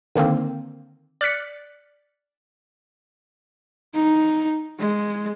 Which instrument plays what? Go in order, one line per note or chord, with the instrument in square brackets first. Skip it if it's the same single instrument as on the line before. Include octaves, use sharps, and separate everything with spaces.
[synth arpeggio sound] D3 D#3 A#3 C4
D5 F6 F#6 B6 C#7
[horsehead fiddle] D#4
G#3